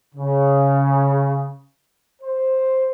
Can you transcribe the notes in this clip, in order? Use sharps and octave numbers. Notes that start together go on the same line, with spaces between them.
C#3
C5